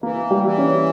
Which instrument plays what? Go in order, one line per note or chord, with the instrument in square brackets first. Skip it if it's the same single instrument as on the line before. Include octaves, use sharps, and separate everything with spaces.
[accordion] E3 [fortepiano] A#3
[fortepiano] G3
[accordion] E3
[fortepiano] C#4